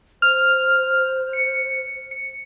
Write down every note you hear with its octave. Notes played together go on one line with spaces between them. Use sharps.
C5 F6
C#7
C#7